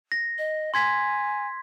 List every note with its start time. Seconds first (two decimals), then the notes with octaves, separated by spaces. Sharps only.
0.12 A#6
0.38 D#5
0.74 G#5 C6 G#6 B6